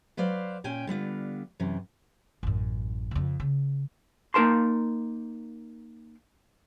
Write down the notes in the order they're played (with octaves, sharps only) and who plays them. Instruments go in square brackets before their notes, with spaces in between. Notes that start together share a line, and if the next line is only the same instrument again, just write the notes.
[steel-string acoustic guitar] F#3 B4 C5 D5 F5
A#2 C#4 G5 G#5
D3 G3 B3 F4
F#2 C3 E3
[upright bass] A1 F#2
F2 C#3
C#3
[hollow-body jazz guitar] A#3 D#4 A#4 A5 C6